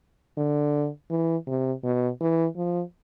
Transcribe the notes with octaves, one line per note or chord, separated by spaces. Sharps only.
D3
E3
C3
B2
E3
F3